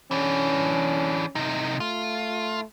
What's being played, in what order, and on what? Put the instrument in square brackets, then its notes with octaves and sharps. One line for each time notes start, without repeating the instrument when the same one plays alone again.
[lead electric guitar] E3 D4 [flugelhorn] C#4
[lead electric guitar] C3 D#4
[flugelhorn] A3 [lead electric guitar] F4